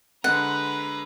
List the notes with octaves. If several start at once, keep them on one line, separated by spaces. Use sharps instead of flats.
D3 G#3 B4 F#5 A#5